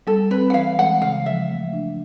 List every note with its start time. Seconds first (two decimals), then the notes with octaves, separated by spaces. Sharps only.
0.07 G3 A4
0.30 C4 B4
0.50 F#5
0.54 E3 F5
0.78 G#3 F#5
1.02 C#3 F5
1.26 F3 E5
1.49 A3
1.73 D4